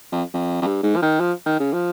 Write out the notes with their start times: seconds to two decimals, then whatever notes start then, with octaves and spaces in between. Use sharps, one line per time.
0.12 F2
0.34 F2
0.62 F2
0.67 G2
0.83 G#2
0.96 F3
1.02 D#3
1.20 F3
1.46 D#3
1.60 C#3
1.73 F3